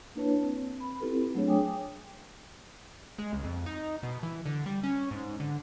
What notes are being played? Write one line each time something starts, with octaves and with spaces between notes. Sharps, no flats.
A#3 D4 E4 B4 C#5 A5
C4
B5
C4 E4 F4 G4 A4 B4
F#3 A3 D4 G#4 C#5
G5 G#5 D6 D#6
G#3
C#2
F2
D#4
B2
E3
D3
G3
C#4
G#2
D3